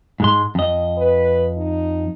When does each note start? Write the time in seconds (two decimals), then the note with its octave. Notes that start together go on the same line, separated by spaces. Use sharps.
0.20 G#2 G#3 C6
0.55 F2 D#5
0.98 B4
1.58 D#4